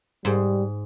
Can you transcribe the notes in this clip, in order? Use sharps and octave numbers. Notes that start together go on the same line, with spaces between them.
G#2 G3